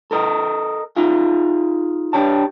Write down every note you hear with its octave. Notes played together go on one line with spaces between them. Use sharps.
A4 A#4 D#5
D#4 F4 G#4
D4 G4 C#5 A5